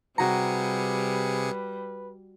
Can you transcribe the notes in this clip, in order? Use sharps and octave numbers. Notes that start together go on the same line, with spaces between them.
C3 G3 F#4 G#4 B4 A#5 C#7